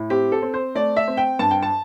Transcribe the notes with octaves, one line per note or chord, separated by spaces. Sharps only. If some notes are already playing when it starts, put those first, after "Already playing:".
Already playing: A2
C4 G4
A4
C4
C5
A3 D5
E5
C4
G5
G2 A5
G5
A5